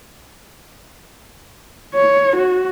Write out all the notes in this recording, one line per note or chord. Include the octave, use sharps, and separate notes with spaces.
C#5
F#4